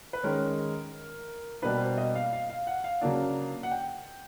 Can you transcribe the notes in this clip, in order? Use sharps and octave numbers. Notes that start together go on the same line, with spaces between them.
B4
D#3 G#3 C#4 A#4
B2 G3 A#3 D4 B4
C5
D#5
F5
F5
F5
F#5
F5
C#3 F#3 A#3 D4
F#5
G5